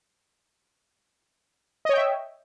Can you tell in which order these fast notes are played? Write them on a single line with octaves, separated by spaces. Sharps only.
D#5 C#5 G5 E5